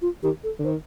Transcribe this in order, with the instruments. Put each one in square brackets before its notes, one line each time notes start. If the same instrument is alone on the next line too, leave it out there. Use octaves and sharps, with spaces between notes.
[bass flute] F4
[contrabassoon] D#3 [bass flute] G4
[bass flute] A4
[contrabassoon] D3
[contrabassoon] D#3 [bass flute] C5